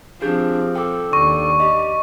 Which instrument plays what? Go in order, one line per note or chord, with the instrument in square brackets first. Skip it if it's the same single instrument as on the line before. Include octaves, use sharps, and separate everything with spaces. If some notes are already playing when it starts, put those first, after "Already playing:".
[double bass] F3 C4 [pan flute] D4 [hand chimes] G4 G#4 G6
[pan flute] A4 [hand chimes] G5 D6
[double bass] D#2 D4 [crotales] C#6
[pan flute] G4 [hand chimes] D#5